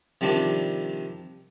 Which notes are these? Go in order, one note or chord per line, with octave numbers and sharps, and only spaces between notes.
C3 D#3 F3 G3 D4